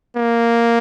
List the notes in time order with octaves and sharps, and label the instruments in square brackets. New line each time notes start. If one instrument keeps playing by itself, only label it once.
[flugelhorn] A#3